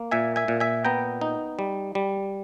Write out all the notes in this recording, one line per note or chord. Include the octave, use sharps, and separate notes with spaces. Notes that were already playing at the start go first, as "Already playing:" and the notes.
Already playing: A#3
A#2 E5 G#5
E5 G#5
A#2
E5 G#5
B3 G5 A#5
D#4
G3
G3